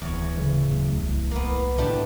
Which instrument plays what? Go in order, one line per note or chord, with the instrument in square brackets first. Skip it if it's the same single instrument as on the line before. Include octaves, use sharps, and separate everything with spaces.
[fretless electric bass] D1 [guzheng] E2 C#5
[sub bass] C#3
[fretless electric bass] D1 F#2 A3
[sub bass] C2
[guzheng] A#3 B3
[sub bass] A2 [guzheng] A3 D4 G4